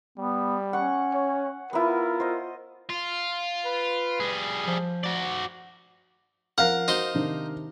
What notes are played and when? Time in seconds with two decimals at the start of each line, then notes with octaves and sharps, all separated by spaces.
0.18 G3 B3
0.73 C#4 F#5 C#6
1.13 C#5
1.73 B3 E4 F4 A#4
2.20 C5 D#5
2.90 F4
3.65 B4
4.20 G3 G#4
4.67 F3
5.04 F#4 D5
6.58 F3 A#4 F5 F#5 F6
6.88 D#4 F#4 C5
7.14 C3 D#3 D4